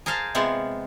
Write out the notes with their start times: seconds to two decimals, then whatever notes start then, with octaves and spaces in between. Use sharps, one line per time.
0.06 G#4 A#4 C5 F5 A5
0.35 C3 G#3 B3 F4 F#5